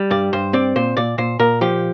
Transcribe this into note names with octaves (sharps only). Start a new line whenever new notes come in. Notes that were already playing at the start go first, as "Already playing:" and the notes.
Already playing: G3
G2 D5
G2 C5
C4 D5
A#2 C5
A#2 D5
A#2 C5
A#2 A#4
F3 G4